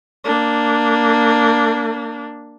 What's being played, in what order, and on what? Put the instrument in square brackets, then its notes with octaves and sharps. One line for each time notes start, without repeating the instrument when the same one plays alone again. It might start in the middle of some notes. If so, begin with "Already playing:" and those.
[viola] A#3 D4